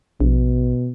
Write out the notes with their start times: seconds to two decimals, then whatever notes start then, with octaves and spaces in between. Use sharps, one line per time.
0.20 A#1 B2